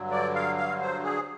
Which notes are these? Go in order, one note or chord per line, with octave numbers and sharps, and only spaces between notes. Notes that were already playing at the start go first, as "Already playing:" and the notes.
Already playing: G2 D3 F#3
D5
F5
F5
C5
G#4